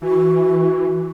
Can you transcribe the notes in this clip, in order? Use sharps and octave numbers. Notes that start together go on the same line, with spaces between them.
E3 F#4